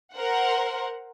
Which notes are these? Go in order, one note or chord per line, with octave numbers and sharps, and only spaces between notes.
A#4 C5 F#5